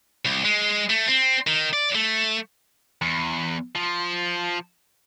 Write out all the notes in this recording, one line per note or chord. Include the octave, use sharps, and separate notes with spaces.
C2
G#3
A3
C4
D#3
D5
A3
E2
F3